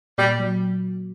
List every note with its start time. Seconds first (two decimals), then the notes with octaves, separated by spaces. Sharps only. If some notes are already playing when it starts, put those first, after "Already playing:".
0.18 A#2 G3
0.39 F#3